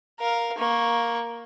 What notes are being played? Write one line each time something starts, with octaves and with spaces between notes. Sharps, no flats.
A#4 F5
A#3 C#6